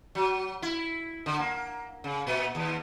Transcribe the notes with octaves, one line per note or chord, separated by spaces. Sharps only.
F#3
E4
D3
A#3
C#3
A#2
D#2